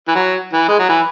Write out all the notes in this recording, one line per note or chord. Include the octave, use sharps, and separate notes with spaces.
E3
F#3
E3
G#3
F#3
E3